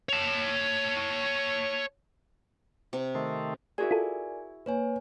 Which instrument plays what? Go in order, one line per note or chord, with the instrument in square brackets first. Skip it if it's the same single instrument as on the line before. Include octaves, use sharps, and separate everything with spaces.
[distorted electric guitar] C#5 A5
[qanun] C3
[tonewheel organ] D#3 A3 C4
[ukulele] E4 F#4 G#4 [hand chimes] A#4 D5 G#5
[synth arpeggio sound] F4 A4
[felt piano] A#3 [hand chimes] B4 C#5 G#5